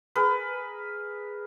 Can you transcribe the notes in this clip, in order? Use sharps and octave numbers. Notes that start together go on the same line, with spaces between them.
G#4 A#4 B4